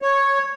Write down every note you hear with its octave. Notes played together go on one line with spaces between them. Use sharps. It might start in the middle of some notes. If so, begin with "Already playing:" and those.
C#5